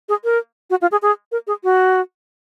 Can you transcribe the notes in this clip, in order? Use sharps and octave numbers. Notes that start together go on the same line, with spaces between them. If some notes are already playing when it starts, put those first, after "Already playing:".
G#4
A#4
F#4
F4
G#4
G#4
A#4
G#4
F#4